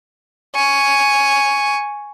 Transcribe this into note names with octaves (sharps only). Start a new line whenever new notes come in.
G#5 C#6